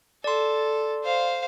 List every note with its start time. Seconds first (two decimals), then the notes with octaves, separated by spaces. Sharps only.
0.24 A4 D5 C6
1.04 C5 F5